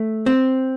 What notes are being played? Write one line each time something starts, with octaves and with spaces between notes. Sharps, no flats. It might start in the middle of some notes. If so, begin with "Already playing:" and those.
Already playing: A3
C4